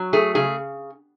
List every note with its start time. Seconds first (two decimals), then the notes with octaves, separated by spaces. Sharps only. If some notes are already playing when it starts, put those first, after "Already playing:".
Already playing: F#3
0.13 A3 G#4
0.35 C#3 G#4